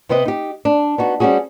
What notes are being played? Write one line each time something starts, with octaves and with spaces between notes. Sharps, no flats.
C3 B3 C4 B4 D#5
D#4 G4
D4
B3 D#4 F#4
G3 C4 C#4 F#4 G#4